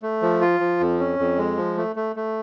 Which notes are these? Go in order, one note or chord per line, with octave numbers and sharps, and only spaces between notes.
A3
F3
F4
F3
F2
C#4
F2
G#3
F3
A3
A3
A3